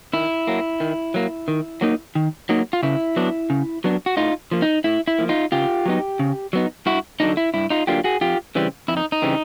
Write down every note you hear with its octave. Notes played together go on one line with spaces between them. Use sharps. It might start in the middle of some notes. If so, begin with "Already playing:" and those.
D#3 E4
F#3 A#3
D#3
F#3 A#3
D#3
F#3 A#3 D#4
D#3
F#3 A#3 D#4
F4
C#3 E4
F#3 B3 D4
C#3
F#3 B3 D4
F#4
A2 D#4 F4
F3 A#3
D#4
A2 E4
E4
F3 A#3
D#4 F4
C#3 F4 G4
F#3 B3 D#4
C#3
F#3 B3 D#4
G2 E4 F#4
D3 F#3 A#3 D4 D#4
E4
G2 E4
D#4 F4
D3 F#3 A#3 D4 F4 G4
F#4 G#4
F2 F4 G4
C#3 E3 G3 C4
F2 E4
D#4
D#4
C#3 E3 G3 C4